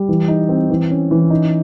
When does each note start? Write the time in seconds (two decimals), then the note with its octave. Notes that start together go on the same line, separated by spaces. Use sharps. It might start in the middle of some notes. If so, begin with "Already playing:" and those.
Already playing: G3
0.09 E3
0.28 D#4
0.49 C4
0.70 E3
0.90 C#4
1.11 E3
1.30 D#4